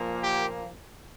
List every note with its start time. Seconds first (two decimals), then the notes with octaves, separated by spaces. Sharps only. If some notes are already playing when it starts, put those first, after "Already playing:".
Already playing: A#2 F3 A#3
0.23 G4